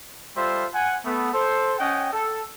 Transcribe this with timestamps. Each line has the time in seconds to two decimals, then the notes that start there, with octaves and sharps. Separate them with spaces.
0.36 G3 F4 A4 C5 E5
0.74 F#5 G#5
1.05 A3 B3
1.33 A4 C5
1.79 C#4 D#5 F#5 G5
2.13 A4